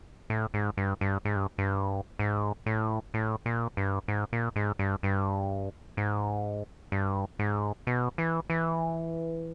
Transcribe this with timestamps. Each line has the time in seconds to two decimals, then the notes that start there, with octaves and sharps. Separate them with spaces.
0.30 A2
0.54 G#2
0.77 G2
1.01 G2
1.25 G#2
1.36 G2
1.58 G2
2.19 G#2
2.66 A2
3.14 A2
3.46 A#2
3.77 G2
4.08 G#2
4.33 A#2
4.56 G#2
4.79 G2
5.03 G2
5.97 G#2
6.92 G2
7.39 G#2
7.87 B2
8.18 E3
8.50 E3